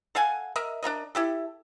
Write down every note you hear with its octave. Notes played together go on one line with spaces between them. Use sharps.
A4 F5 F#5 G#5
A#4 D#5 E5
D4 F4 A#4 D#5
E4 G4 A4